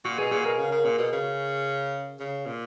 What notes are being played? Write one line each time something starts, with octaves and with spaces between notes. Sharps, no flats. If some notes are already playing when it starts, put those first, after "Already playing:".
A#2 F#4
B2 G#4
A#2 G#4
B2 A#4
C#3
C#3
A#2
B2
C#3
C#3
A#2